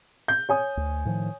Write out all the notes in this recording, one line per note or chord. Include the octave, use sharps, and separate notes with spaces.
G6
C#5 G#5 D#6
D2
A2 D#3 F3